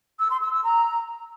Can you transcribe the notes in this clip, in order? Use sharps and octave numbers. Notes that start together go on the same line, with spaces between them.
E6
C6
E6
E6
A#5